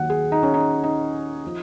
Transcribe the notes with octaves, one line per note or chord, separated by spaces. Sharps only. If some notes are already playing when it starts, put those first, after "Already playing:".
Already playing: D#2 D#3 F#3 F#5
G#4
D#4
C#4
D#4
D#4
F3